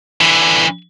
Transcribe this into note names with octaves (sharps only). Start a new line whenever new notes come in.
D3 E3